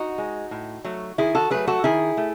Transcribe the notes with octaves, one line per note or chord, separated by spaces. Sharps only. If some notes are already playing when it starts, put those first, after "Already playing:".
Already playing: D#4 F#4
G#3
A2
F#3 A3
D#3 E4 G#4
F#4 A4
F#3 A3 G#4 B4
F#4 A4
D#3 E4 G#4
A3